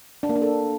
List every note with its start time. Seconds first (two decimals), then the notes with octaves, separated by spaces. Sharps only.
0.23 D4
0.29 A#3
0.36 D4
0.42 A4